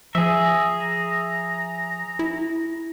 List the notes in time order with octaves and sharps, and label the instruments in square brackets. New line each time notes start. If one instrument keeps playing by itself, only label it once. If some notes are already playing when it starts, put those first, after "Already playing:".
[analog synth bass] F3 [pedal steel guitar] G#4 E5 [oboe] A#5
[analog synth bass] E4